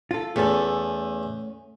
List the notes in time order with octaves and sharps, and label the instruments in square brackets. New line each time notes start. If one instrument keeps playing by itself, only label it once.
[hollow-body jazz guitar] F4 A4
[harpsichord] E2 [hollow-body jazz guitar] A3 C#4 A4